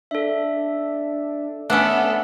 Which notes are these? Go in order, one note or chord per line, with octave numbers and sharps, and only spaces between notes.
D4 A4 E5
A3 B3 C#4 D4 A4 E5